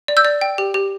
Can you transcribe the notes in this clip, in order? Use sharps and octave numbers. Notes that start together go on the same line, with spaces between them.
D5
E6 G6
D5
G5
G4
G4